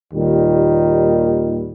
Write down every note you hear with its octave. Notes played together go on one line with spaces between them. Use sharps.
D#2 A#2 D#3 G3